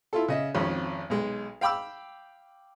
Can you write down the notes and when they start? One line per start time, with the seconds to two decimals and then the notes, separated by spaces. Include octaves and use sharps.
0.13 E4 F4 A4
0.28 C#3 D#5 E5
0.55 G#1 F2 C#4
1.10 B1 G#3
1.61 F5 G5 B5 D6 E6